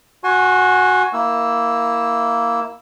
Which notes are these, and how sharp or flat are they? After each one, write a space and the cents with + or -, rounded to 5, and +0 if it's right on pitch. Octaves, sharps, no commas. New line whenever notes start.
F#4 -5 G#5 +0 C6 +45
A#3 +0 E4 -10 E6 +0